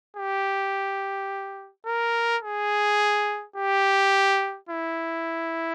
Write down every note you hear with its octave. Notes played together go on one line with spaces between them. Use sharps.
G4
A#4
G#4
G4
E4